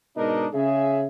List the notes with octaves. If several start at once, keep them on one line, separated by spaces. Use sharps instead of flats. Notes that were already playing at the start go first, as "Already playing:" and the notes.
G#2 B2 D4 D#4 A#4 D#5
C#3 G#4 E5